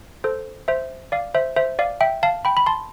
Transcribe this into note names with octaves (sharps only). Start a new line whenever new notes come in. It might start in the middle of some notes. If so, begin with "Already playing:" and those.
A4 C5
C5 E5
D5 F5
C5 E5
C5 E5
D5 F5
E5 G5
F5 A5
G5 B5
B5
A5 C6